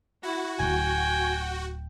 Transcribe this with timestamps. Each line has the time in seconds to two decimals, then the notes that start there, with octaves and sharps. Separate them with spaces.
0.23 E4 F#4
0.60 D1 G5 G#5